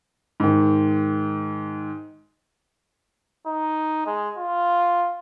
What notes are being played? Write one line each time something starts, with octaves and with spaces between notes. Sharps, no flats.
G#2 D#3
D#4
G#3
F4